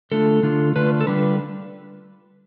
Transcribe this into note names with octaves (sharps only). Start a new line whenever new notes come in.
D3 A3 D4 F4 A4
D3 A3 D4 F4
D3 A3 D4 F4 B4
A4
D3 G3 D4 F4 B4